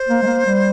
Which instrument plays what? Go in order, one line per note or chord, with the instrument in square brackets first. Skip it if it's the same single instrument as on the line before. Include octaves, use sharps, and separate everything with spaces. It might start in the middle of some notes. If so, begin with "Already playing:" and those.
Already playing: [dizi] C5
[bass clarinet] A#3
G#3
A#3
G3